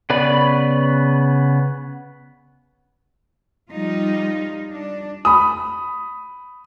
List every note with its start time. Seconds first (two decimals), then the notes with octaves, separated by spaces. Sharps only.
0.10 C#3 B3 B4 D5 B5
3.70 F3 G3 D#4 F4
4.72 D4
5.25 B5 D#6